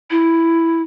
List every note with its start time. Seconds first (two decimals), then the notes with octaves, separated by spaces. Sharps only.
0.11 E4